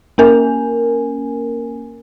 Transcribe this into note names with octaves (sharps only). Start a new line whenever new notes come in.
A#3 C#4 A#4 G#5